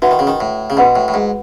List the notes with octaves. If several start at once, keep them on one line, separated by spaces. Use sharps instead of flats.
E3 F#4 B4 F#5 B5
D#3
C#3
D#3
A2
C#3
B2 F#4 B4 F#5 B5
A2
A2
G#2